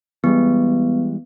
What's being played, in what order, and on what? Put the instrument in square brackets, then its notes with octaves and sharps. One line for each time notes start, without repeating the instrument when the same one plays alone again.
[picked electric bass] E3 G3 G#3 [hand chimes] B3